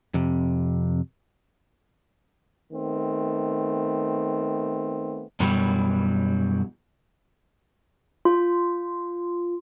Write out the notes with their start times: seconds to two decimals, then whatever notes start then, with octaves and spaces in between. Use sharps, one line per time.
0.14 F2 C3
2.73 D#3 A3 B3 C4
5.40 F#2 B2 E3 F#3 G3
8.25 F4